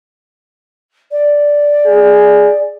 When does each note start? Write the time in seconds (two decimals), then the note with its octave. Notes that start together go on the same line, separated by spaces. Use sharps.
1.11 D5
1.86 G#4